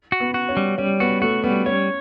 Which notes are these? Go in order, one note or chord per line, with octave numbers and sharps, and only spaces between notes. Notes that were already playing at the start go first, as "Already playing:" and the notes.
F#4
B3
F#4
C#4
G3
G3 C#4
B3 F#4
A3 F#4
G3 B3
C#4 C#5